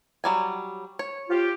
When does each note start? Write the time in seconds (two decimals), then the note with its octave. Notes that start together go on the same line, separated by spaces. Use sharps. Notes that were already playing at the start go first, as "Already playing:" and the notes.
0.24 F#3 G3 G#5
0.99 C#5
1.29 F4 G4